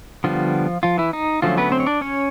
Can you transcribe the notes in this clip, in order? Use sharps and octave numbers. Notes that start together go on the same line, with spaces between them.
D3 F3 G3 B3 F4
F3 F4
E3 E4
D#4
D3 F3 F#3 A3 C#4 F4
B3 B4
C4 C5
C#5
D4 D5
C#4 C#5